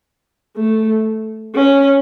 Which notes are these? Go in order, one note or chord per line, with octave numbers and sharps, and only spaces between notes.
A3
C#4